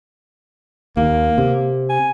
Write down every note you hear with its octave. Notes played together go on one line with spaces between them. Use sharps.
D#2 A#3
C3
G#5